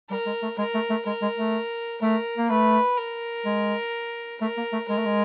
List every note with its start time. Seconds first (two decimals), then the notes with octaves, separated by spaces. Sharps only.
0.10 G3 A#4
0.26 G#3
0.43 A3
0.58 G#3 A#4
0.74 A3
0.90 A3
1.06 G#3 A#4
1.22 G#3
1.38 A3
2.02 A3 A#4
2.37 A#3
2.50 A3 B4
2.97 A#4
3.45 G#3
4.41 A3 A#4
4.58 A#3
4.73 A3
4.89 G#3 A#4
4.97 A3
5.06 G#3